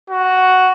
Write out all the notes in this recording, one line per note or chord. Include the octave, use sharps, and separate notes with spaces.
F#4